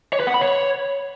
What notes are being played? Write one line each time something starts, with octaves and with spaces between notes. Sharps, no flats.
C#5
B4
F#5
B5
C#5